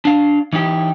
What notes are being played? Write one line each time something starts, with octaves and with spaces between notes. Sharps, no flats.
D4 F5
E3 D#4 E4 G4